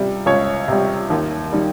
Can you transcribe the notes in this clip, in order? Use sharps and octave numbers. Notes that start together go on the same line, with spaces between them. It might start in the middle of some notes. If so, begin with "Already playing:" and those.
Already playing: C#2 C3 G3
C#2 C#5
C3 G3
D#2
D#3 G3